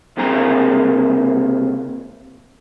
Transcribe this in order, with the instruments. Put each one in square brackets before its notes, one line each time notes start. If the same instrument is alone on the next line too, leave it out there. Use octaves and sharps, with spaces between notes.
[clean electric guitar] C#2 C3 A#3 G#4 A#5